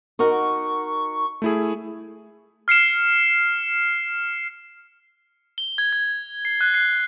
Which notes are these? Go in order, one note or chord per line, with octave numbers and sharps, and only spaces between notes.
D#4 F#4 A#4 C#6
A3 E4 G#4
F6 C7 C#7 E7
G7
G#6
G#6
C7
F#6
C7